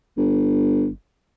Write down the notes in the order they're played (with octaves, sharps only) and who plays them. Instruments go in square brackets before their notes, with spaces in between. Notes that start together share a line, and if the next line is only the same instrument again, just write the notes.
[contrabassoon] G1